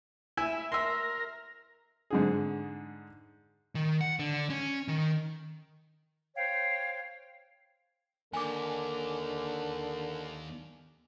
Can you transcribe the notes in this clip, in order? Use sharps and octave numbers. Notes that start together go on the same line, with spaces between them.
E4 E5 G#5
A#4 E5 C6
G#2 D3 G#4
D#3
F#5
D3
C#4
D#3
C5 C#5 F5 G5
D#2 D3 A#4 G#5 D6